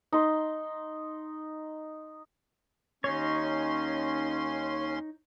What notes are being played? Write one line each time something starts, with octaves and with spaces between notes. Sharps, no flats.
D#4 C6
D#2 C#4 D#4 C#5 C6